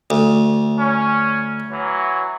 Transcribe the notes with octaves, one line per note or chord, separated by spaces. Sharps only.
D2
C#4
E3 F#3